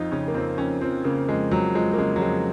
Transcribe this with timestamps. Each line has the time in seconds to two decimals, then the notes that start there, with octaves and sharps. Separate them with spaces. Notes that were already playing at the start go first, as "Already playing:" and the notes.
Already playing: F2 F3 D#4 F4
0.12 C#3 C#4
0.28 A#3
0.34 F2 C4
0.58 F2 C#4
0.81 F3 C4
1.04 C#3 A#3
1.28 F2 G#3
1.51 F2 F#3
1.74 F3 G#3
1.93 A#3
1.98 C#3 G#3
2.16 F#3
2.21 F2 G#3